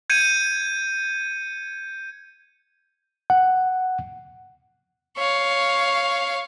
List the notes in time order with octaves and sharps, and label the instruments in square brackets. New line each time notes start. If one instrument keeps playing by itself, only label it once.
[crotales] G6 G#6 C#7 D#7
[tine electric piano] F#5
[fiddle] C#5 F5